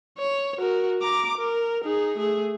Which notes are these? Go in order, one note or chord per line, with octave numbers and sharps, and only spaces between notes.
C#5
F#4 A#4
A#5 D6
A#4
D#4 G#4
A3 G#4